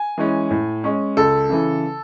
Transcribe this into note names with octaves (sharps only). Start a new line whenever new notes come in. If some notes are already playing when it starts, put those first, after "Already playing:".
Already playing: G#5
E3 G#3 C#4
A2
G#3 C#4
C#2 A4
C#3 E3